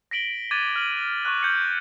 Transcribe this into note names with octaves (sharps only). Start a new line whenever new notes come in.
A#6 B6 D7 F#7 G7
D6 F#6 G#6 A6 D#7
F6 F#7
C#6 D6 F#6
G6 C#7 F#7